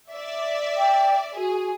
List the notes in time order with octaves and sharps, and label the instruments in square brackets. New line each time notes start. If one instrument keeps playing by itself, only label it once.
[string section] D5 E5
[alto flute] G5
[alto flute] F#4 [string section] G#4